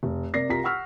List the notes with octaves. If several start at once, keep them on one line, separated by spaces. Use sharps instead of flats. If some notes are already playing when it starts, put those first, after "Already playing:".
F1
C3 A#4 D5 A#6 C7
C2 F4 A#4 A#5 B6
F#5 C#6 E6 F6 B6